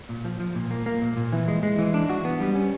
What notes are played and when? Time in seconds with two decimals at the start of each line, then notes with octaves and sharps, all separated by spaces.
0.09 A#2
0.25 F3
0.40 F3
0.55 A#2
0.71 A#3
0.86 A#3
1.02 A#2
1.17 A#2
1.33 E3
1.48 G#3
1.63 G#3
1.79 E3
1.94 D4
2.09 F#4
2.25 B3
2.40 G3
2.55 C#4